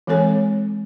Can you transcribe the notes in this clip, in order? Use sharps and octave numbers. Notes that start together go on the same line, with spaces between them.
E3 G#3 C4 A4 C#5 G#5